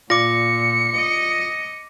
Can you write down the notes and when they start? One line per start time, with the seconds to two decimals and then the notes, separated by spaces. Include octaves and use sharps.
0.10 A#2 F4 D5 D6 A#6 C#7
0.96 D#5